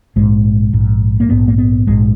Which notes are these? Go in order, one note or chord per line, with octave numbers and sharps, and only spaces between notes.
A#1 G#2 G#3
A#1 G#2
A#3
A#1 G#2 B3
A#3
B3
A#1 G#2 G#3